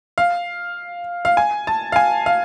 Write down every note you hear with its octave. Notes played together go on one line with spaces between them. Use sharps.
F5
F5
G#5
A5
F5
G#5
F5